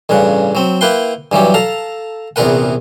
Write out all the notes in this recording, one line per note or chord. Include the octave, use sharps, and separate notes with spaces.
A1 G2 C#3 F#5
F#3 C4
A#3 E4 B4 F#5 G5 C6
G2 E3 F#3 G4
A4 F5 A#5
A#1 E2 C3 A#4 B4 F#5